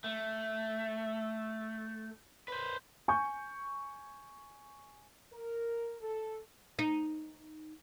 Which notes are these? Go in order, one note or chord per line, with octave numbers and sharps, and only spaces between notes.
A3
B4 C5
G#5 C#6 G6
A#4
A4
D#4